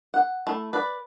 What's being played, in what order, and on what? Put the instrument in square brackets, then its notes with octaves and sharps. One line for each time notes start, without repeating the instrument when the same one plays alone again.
[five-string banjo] F#5
A3 E4
B4 D5